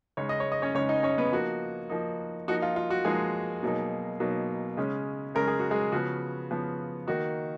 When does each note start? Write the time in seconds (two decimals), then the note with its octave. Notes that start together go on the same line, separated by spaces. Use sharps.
0.17 C#3 G#3 D#4 C#5
0.29 D#5
0.40 C#5
0.52 D#5
0.62 C#4 C#5
0.75 C#3 G#3 C#4 D#4 C#5
0.89 D#4 D#5
1.03 C#4 C#5
1.18 B3 B4
1.32 F3 A#3 D#4 F#4
1.90 F3 A#3 D#4
2.48 F3 A#3 D#4 F#4
2.62 F4
2.76 F4
2.90 F#4
3.05 F3 G#3 A#3 D#4 G#4
3.63 B2 F#3 A#3 D#4
4.20 B2 F#3 A#3 D#4
4.77 C#3 G#3 C#4
5.35 C#3 G#3 C#4 A#4
5.48 G#4
5.60 F#4
5.71 G#3 G#4
5.92 C#3 F3 B3 F#4
6.51 C#3 F3 B3
7.07 D#3 A#3 D#4 F#4